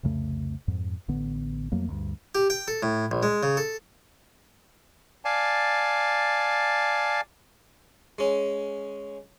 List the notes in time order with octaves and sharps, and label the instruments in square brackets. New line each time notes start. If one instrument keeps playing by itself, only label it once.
[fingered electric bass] C2 F2 C#3 A3
F2 G#2
A1 D3 B3
F2 F#3 A3 A#3
D2 G2
[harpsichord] G4
G5
A4
A2
A#1
G#3
C#3
A4
[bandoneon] D5 F5 G#5 A5
[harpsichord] G#3 C#4